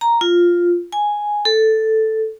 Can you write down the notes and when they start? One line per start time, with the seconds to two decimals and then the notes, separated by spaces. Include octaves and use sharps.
0.01 A#5
0.21 F4
0.92 G#5
1.45 A4